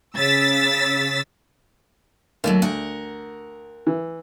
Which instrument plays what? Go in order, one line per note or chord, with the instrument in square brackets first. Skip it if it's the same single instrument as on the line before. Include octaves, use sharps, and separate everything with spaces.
[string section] C#3 E6 A6 B6
[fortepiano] D#2 [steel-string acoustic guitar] F#3 A3 A#3
[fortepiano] D2 [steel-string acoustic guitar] A#4 F#5
[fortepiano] E3